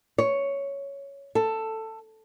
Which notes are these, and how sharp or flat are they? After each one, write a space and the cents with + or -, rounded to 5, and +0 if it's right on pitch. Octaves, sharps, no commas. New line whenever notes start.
C#5 +5
A4 +10